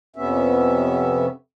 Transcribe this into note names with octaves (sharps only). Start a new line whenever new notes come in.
F2 C3 B3 C#4 E5